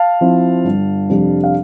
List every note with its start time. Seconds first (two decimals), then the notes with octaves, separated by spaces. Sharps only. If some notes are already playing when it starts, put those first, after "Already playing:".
Already playing: F5 A5
0.21 F3 C4 E4
0.65 G1
1.09 F2 C3 G3 D4
1.44 F5